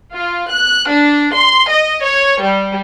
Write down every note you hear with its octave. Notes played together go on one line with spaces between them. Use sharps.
F4
F#6
D4
C6
D#5
C#5
G3